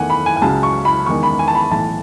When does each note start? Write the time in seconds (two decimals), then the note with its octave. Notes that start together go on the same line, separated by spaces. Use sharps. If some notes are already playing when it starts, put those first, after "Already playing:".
Already playing: E2 D#3 A3 F#5 G#5
0.10 B5
0.26 G#5
0.37 G#5
0.42 C#2 C#3 F#3 A5
0.63 C#6
0.85 B5
1.06 E2 D#3 G#3 C#6
1.23 B5
1.39 G#5
1.48 A5
1.55 B5
1.71 B1 A2 E3 A5